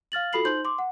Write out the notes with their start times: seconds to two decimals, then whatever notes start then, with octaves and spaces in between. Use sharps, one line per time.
0.12 F5 F6 A6 F#7
0.33 F4 F#4 A4 B5 C7 F#7
0.45 D#4 C5 C6 G6 F#7
0.65 C6 D6
0.79 F#5